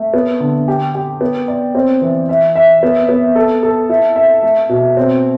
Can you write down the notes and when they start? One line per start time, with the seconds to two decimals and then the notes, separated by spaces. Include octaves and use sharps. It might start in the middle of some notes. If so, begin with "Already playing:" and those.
Already playing: A3
0.14 B3
0.40 D3
0.68 G4
0.94 G4
1.21 B3
1.48 D5
1.75 C4
2.01 E3
2.29 E5
2.56 E5
2.83 B3
3.09 B3
3.35 A4
3.63 A4
3.89 E4
4.16 E5
4.43 A3
4.69 B2
4.97 C4